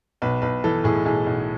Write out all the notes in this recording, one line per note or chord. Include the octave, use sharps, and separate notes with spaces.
B1 B4
B1 B4
E3 A4
A2 G#4
B1 G#4
B1